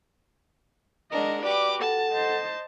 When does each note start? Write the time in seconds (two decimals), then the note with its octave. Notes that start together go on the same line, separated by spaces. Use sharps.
1.11 G#3 D4 A#4 D#5 F#5
1.43 F#4 G4 B4 D5 D6
1.80 A4 F#5 A5
2.12 C5 D#5